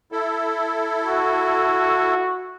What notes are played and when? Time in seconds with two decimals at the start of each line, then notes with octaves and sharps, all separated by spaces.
0.12 E4 A4
1.04 F#4